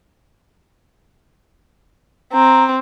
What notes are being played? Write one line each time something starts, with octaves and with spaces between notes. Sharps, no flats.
C4 A#5